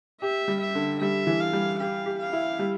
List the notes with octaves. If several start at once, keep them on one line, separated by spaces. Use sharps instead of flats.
G4 E5
G3
E5
D3
G3 E5
E3
F5
G3
G4 F5
G4
F5
E4
G3